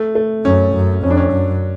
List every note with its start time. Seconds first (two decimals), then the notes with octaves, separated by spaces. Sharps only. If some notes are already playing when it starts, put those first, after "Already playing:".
Already playing: A3
0.15 A3
0.45 F#2 C#4
0.74 F#2
1.03 F2 C#4
1.10 D4
1.17 C#4
1.32 F#2